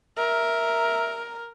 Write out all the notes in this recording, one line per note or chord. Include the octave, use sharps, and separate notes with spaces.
A#4 E5